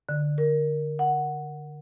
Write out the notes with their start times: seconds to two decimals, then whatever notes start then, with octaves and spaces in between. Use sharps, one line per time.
0.09 D3
0.38 A#4
0.99 F#5